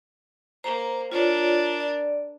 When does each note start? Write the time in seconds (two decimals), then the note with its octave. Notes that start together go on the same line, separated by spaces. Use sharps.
0.64 A#3 C5 A#5
1.12 D4 F4 A#4 C#5 D5
1.80 D5